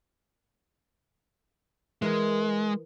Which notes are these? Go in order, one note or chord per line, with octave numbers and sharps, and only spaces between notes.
E3 G#3 A#4